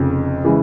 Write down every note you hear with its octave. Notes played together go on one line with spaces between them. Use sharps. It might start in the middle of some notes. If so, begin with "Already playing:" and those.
Already playing: F1 F2 C#3 F3
C#3 E3 G#3